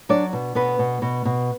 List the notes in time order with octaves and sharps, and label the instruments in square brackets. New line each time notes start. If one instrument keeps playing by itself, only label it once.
[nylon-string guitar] F#3 D4 D5
B2
B2 B3 B4
B2
B2
B2